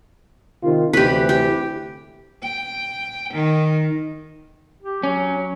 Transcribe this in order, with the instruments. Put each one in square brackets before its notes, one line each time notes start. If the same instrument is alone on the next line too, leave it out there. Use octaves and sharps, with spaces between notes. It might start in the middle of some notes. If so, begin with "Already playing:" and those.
[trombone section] C3 D#3 F4
[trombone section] D2 C3 E3 [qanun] G4 B4
[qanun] G4
[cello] G5
D#3
[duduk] G4
[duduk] F#3 [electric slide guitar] C#4